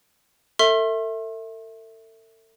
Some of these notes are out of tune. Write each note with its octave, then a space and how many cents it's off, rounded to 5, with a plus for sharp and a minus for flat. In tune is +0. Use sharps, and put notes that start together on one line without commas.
A4 +40 E5 -10 C6 +45